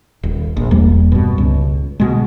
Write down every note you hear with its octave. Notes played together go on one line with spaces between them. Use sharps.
D#1
A#1
E1 E2 G3 A#3
G2 B2
C#2
B2 G#3